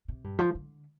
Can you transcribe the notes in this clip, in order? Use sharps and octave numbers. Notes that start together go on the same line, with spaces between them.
C3
G2
F3
D3